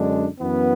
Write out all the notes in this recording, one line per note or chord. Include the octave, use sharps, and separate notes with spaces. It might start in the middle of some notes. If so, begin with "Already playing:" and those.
Already playing: F#2 D3 G#3 D4
F#2 E3 B3